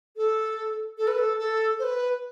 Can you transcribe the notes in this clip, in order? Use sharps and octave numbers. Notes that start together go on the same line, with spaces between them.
A4
A4
B4
A4
A4
C5
B4